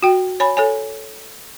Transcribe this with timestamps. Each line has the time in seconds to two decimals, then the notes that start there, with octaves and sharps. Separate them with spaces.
0.03 F#4 G5
0.40 C#5 G#5 B5
0.57 A4 C#5 G#5